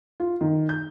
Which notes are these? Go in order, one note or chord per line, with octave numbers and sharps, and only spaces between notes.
F4
D#3
G6